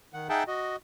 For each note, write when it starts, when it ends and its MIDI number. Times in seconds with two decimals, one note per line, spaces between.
0.14 0.28 51
0.14 0.28 78
0.29 0.43 63
0.29 0.43 68
0.29 0.43 76
0.29 0.43 78
0.29 0.43 79
0.29 0.43 81
0.48 0.76 66
0.48 0.76 75